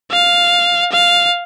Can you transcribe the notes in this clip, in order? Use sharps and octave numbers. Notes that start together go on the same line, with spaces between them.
F5
F5